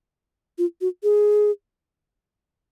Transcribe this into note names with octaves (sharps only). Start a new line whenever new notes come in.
F4
F#4
G#4